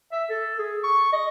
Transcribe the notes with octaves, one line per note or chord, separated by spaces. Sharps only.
E5
A4
G#4
C#6
D#5